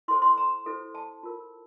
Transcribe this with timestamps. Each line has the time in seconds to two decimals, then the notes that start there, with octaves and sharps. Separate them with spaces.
0.08 E4 A4 C5 C6
0.22 C6
0.38 A#5
0.66 E4 A4 C5
0.95 A5
1.23 F4 A#4